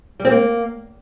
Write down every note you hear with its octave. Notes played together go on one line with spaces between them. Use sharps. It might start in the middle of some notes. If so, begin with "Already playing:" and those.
G3
C4
A#3